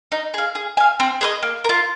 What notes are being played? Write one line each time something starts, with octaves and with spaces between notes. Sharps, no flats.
D#4
G#4 F5
G#4
F5 G#5
C4
G#4 C5 D#5
A#3
A#4
F4